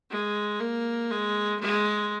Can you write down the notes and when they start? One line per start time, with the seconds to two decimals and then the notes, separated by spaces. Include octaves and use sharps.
0.11 G#3
0.60 A#3
1.10 G#3
1.60 G#3